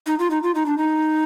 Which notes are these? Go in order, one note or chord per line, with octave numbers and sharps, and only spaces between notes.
D#4
F4
D#4
F4
D#4
D4
D#4